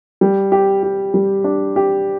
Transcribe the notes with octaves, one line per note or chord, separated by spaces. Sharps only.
G3
G4
G4
G3
D4
G4